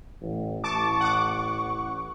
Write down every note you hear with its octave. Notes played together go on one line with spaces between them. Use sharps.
A1
A1 A5 C#6 D6
F#5 D6